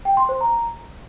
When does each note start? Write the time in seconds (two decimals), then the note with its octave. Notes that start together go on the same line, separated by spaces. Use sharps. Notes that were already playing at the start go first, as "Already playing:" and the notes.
0.05 G5
0.17 C6
0.29 C5
0.41 A#5